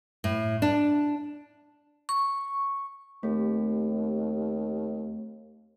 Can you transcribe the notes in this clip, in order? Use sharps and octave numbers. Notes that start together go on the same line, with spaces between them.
A2
D4
C#6
D#2 A3 C4 G4